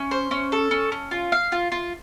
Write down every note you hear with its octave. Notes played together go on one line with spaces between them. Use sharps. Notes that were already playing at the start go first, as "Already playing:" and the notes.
Already playing: C#4
C5
C#4
A4
C#4
C#4
F4
F5
F4
F4